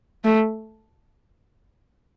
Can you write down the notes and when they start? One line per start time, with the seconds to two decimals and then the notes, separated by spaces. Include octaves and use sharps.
0.24 A3